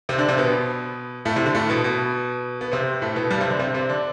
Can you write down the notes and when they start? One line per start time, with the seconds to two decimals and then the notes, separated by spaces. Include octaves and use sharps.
0.09 C3 C4
0.18 D3 D4
0.28 C3 C4
0.38 B2 B3
1.25 A2 A3
1.36 C3
1.46 D3
1.55 A2 A3
1.69 B2 B3
1.84 B2 B3
2.61 B3
2.72 C3 C4
3.02 A2 A3
3.16 B2 B3
3.31 G2 G3
3.41 C3 C4
3.50 D3 D4
3.59 C3 C4
3.74 C3 C4
3.89 D3 D4